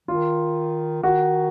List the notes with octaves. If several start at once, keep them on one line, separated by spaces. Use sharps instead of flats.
D#3 F4
D#3 F#4